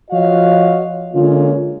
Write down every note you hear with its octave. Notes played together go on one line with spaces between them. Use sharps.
F3 F4 F#4 C#5 D#5 F5
D3 G#3 A#3 C#4 F4